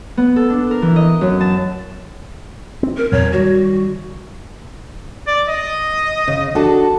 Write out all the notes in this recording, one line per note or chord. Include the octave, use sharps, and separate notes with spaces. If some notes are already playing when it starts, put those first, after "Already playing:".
B3
A4
D4
A#4
E3
D#5
F#2
A5
C4
A#4
E2 A#2 F#3 C#5
D#3 G3 F#4
D5
D#5
C#3
D4 F#4 A4